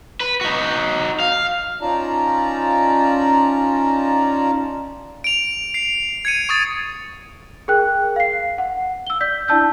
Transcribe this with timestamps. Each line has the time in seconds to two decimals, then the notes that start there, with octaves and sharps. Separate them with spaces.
0.20 B4
0.41 D#4 F#4
1.20 F5
1.81 C#4 D#4 F4 D5 A5 A#5
5.24 D7 F7
5.74 C7
6.25 G#6 C#7 D#7
6.49 C#6 D#6 A6
7.68 G#4 A#4 G5 F#6
8.16 F5 C7
8.58 F#5
9.07 E6 G7
9.21 D5 G6 B6
9.48 D4 E4 D5 A5 E6 G6